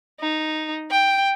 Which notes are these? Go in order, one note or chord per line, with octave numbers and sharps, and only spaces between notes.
D#4
G5